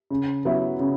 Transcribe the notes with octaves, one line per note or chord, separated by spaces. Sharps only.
C#3
F#3 B3 E4
C#3